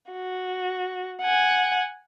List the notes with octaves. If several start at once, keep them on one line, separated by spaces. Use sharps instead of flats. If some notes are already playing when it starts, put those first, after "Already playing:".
F#4
F#5 G#5